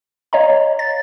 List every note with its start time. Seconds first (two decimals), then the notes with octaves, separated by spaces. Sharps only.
0.33 C#5 D#5 F5 A#5
0.79 A6